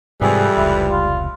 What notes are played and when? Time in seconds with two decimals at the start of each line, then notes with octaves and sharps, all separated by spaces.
0.21 F2 G#2 C3 E3 G3 G#3 G#4
0.57 F1 C#2 E4
0.91 F4